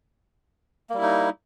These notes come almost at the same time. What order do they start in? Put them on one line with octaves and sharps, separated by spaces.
A#3 G3 E4 D#4